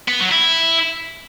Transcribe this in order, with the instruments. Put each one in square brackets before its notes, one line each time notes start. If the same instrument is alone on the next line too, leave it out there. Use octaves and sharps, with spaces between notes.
[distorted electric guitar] B3
F#3
E4